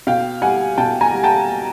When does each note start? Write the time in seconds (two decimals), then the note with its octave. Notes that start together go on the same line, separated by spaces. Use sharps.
0.07 B2 F5 G5
0.42 G3 F#5 G#5
0.78 B2 G5 A5
1.01 G#5 A#5
1.12 G3
1.24 G5 A5